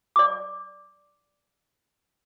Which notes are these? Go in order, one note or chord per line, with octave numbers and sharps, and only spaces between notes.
D5 D6